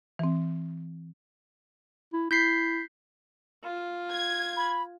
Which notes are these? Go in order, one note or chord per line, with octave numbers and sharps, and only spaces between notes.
E3 C4
E4
E4 G6 B6 C7
F4
G#6
B5